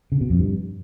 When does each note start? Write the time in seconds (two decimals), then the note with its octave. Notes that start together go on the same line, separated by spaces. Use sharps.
0.12 C#3
0.21 B2
0.30 F2
0.39 G2